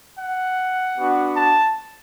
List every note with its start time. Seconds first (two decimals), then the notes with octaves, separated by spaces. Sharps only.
0.18 F#5
0.97 B3 D4 F#4
1.37 A5